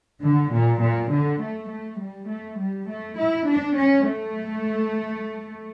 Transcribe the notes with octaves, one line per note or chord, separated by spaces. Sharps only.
D3
A#2
A#2
D3
A3
A3
G3
A3
G3
A3
E4
D4
C#4
A3